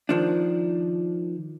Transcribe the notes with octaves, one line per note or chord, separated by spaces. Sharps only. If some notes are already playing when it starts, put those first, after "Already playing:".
D#3 F3 D4